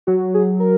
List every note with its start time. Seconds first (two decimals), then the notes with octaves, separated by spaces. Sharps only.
0.07 F#3 F#4
0.34 G#4
0.60 A#4